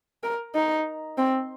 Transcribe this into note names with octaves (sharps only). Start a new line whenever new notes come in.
A#4
D#4
C4